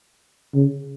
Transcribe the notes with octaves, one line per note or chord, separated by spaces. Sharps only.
C#3